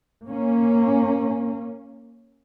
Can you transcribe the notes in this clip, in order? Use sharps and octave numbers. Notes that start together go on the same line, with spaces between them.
A#3 C#4